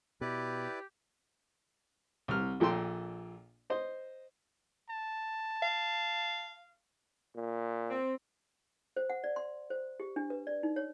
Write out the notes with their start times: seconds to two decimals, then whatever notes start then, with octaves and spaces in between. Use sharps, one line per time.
0.21 B2 E4 G4 B4 D5
2.28 C2 F6
2.60 A#1 A#2 A4 G5 C6
3.70 C5 D#5
4.90 A5
5.63 F5
7.36 A#2
7.88 C4
8.96 C5
9.10 F#5
9.24 D5
9.36 C6
9.70 C5
10.00 G4
10.16 D4
10.30 B4
10.47 D5
10.63 D#4
10.76 C#5